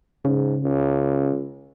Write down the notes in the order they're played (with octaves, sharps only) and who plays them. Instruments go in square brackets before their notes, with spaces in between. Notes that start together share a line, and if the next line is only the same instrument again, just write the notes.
[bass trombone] G#2 [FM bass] C#3
[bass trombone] C#2